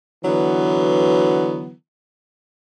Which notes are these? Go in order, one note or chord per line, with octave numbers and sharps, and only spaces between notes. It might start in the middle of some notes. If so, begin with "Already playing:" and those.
D3 E3 F#3 B3